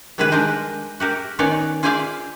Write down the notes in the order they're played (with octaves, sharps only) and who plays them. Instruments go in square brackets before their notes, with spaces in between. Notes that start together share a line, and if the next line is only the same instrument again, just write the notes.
[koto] C3 D#3 G3 G#3 G#4 B4
G#3 D4 A#4 C5
F#4 G4 A#4
D#3 B3 C#4 D#4 C#5 D5
F4 G#4 C5 D5 E5 F5